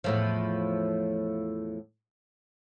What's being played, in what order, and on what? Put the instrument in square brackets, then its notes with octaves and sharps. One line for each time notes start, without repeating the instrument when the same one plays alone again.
[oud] E2 A2 F3